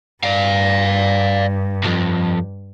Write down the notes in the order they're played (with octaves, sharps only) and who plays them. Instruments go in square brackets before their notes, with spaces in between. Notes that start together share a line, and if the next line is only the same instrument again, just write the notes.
[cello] G2 [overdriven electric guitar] D5 F5
[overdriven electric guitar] B1 F2